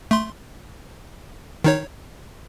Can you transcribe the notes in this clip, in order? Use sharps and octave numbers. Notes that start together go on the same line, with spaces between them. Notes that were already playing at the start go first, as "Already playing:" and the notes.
A3 C6
D#3 D#4 C#5